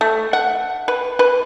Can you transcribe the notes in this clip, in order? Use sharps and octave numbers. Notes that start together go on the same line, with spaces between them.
A3
F#5
B4
B4